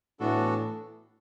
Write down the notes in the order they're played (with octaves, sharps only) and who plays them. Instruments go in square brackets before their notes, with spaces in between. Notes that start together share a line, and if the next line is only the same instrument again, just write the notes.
[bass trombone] A2 [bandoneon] E3 B3 D4 F#4 A4